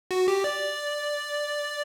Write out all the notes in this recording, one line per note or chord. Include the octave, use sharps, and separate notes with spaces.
F#4
G4
D5